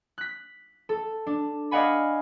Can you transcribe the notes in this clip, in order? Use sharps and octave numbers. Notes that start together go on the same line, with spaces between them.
F#6 B6
A4
D4
D5 D#5 F5 F#5 G#5 B5